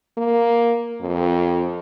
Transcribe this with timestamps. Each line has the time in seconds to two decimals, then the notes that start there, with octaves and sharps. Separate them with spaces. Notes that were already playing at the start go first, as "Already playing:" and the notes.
0.18 A#3
1.01 F2